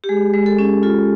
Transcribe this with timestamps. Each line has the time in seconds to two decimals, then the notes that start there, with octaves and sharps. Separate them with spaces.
0.04 G4
0.09 G#3 G#4
0.34 G#3
0.46 A4
0.59 C#4
0.83 F4 A4